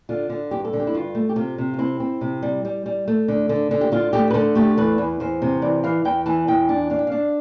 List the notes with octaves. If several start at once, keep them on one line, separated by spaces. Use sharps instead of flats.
D3 F4
D3
G2 G4
A4
D3
G4
E4
G2 F4
A3
G4
C3 F4
C3
F4
C4 E4
C4
C3
G3
G3
G3
A3
D3
D3
D3
G4
D3 F4
A3 G4
B4
D3 A4
A3 G4
E2 B4
E2
E2 C5
C3
E3 D5
E3 F5
E2 G5
E3 A5
E2 G5
D4
D4 F5
G5
D4 F5